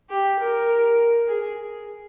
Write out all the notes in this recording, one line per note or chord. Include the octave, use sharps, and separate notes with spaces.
G4
A#4
G#4